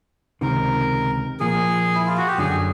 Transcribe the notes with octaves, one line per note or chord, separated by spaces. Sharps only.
C#2 C3 D#3 A#4
A#2 F3 A#3 G#4
E4
F4
F#4
G4
F#2 D3 F#3 G#4